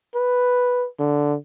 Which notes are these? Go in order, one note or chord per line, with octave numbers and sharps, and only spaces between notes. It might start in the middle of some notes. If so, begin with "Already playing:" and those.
B4
D3